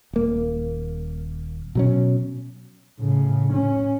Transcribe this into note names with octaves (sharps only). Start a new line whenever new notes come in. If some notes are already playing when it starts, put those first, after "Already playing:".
D#1 A#3
B2 F#3 C#4
A2 C#3
C#4